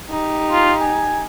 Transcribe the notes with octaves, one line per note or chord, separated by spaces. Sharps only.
D#4 G4
F4
G#5